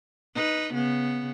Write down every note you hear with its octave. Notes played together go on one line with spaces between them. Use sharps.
D#4 B4
C#3 B3